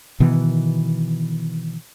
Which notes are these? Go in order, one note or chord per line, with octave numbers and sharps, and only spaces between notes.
B2 D#3 E3 B3